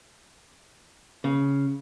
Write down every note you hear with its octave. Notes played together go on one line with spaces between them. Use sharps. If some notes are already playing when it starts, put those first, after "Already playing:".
C#3